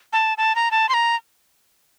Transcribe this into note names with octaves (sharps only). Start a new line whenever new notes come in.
A5
A5
A#5
A5
C6
A#5